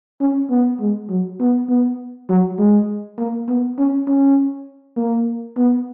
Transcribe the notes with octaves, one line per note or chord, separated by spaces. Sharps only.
C#4
B3
G#3
F#3
B3
B3
F#3
G#3
A#3
B3
C#4
C#4
A#3
B3